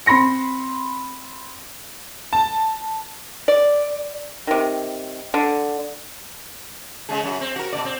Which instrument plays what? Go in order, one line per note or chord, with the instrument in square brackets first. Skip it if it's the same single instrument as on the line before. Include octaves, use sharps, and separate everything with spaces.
[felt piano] C4 B5 C6 A#6 C#7
[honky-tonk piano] A5
[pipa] D5
C3 D#3
D3
[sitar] C#3 G#3 G#4
F#2 F#3
C4
F#4 A#4
B2 D#3 D5
C4